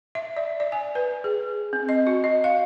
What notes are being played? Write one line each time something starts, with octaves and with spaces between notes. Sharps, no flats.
E5
D5
D5
G#5
B4
G#4
C4
D#5
F#4
D#5
F5